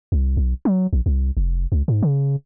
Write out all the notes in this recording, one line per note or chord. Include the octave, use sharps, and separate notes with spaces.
C2
B1
F#3
A#1
C2
F1
C#2
G#2
C#3